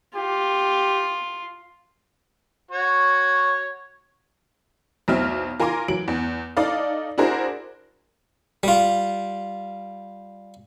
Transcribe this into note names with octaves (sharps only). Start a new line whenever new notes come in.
F4 G4
F#4 C#5
B1 E2 F#3 C4 E5 F6
F4 A#4 G#5 A#5 C6 D6
E3 F#3 D7 F#7
E2
D#4 A4 D5 D#5 F5
D4 E4 F#4 G#4 A#4 C5
G3 F4